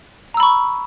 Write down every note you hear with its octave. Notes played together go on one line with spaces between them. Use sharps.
A#5 B5 C#6 E6